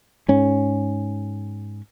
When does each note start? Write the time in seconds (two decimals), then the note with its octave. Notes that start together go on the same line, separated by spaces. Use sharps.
0.28 G#2 C#4